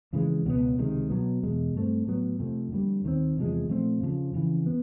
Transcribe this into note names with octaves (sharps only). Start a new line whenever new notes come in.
F2 C#3 E3 G#3
C#2 B2 F#3 B3
C#2 C3 D#3 G#3
B2 F#3 B3
E2 B2 G#3
G2 E3 A3 C4
A2 F#3 B3
F2 C3 F3 A3
F2 D3 G3 A#3
D#2 D#3 G3 C4
E2 C3 F3 G#3
A#2 F3 A3 C4
F2 C#3 F3
F2 C#3 E3
B3